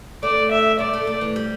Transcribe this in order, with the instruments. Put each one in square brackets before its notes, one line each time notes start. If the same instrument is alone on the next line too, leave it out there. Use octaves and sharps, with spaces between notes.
[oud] A3 [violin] D5
[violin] E5
[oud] G3 [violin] D5
[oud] A3
A3
E3
G3